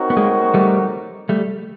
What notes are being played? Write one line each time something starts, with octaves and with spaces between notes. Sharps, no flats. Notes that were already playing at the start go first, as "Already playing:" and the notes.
Already playing: C4 D#4 F#4 A#4 C#5
B3
G#3 A#3
G3 A3
G3 A3